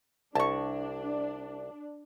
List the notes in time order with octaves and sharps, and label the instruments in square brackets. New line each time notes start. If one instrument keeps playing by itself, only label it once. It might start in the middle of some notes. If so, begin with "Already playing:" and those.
[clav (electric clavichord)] C2 [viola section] D4 [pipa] A5 C#6